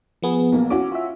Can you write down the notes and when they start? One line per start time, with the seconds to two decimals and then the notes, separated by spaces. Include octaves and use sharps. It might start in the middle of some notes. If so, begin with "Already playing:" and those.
0.22 F3 B3 G#4
0.52 B1 A#3
0.70 C#4 E4 F#4 D6
0.92 F4 E5